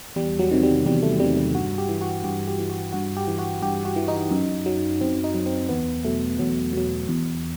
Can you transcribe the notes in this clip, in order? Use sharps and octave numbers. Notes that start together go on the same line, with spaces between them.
E2 G3
F#3
C3 D#3
G3
E2 G3
A3
C3 D#3 G3
G3
G2 F#4
G4
E3
F#4
G2 G4
G4
E3
F#4
G2 F#4
G4
E3
F#4
G2 G4
F#4
E3
D#4
F#2
F#3
F#2 C4
D#4
F#3
C4
E2 B3
B2 F#3 A3
E2 F#3
B2 F#3
E2